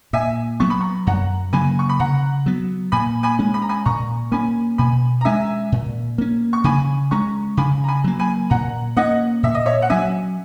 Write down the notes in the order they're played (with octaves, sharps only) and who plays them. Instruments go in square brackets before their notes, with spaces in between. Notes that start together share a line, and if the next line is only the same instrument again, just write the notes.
[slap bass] A#2 [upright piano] E5 G#5
[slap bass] F#3 B3 [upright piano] C#6
[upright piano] B5
A#5 C#6
[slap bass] F#2 [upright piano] F#5 A#5
[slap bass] C#3 F#3 A#3 [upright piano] G#5 B5
[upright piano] C#6
B5
[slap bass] C#3 [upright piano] F#5 A#5
[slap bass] F#3 B3
[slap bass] A#2 [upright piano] G#5 B5
[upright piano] G#5 B5
[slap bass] G#3 C#4
[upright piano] B5
A#5
G#5 B5
[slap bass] A#2 [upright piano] A#5 C#6
[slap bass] A#3 C#4 [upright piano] G#5 B5
[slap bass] B2 [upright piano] G#5 B5
[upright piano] A#5
[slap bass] G#3 C#4 [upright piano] E5 G#5
[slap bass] A#2
A#3 C#4
[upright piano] C#6
[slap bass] C#3 [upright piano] G#5 B5
[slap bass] G#3 C#4 [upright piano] A#5 C#6
[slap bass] C#3 [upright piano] G#5 B5
[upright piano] A#5
G#5 B5
[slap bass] F#3 A#3
[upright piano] G#5 B5
[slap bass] A#2 [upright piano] F#5 A#5
[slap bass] A#3 C#4 [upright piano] D#5 F#5
[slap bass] A#2 [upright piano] E5
[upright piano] D#5
C#5 E5
F#5
[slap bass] F#3 C#4 [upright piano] E5 G#5